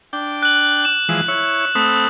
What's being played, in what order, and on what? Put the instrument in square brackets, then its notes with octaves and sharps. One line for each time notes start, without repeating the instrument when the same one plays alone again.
[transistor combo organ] D4 G5
[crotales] F#6 F#7
E7
[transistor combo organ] E3 F3 G#3
E4 C#5
[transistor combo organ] A3 C4 B5 [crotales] D#6